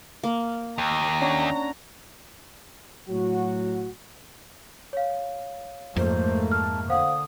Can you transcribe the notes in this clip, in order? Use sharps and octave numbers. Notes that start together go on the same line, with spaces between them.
A#3
D#2 A#5
C#4 D4 F#4
A2 F#3 F#4
C#5 F5
F2 G#2 A3 A#3 C5
A5 F6
D3 C5 F5 F#5 D#6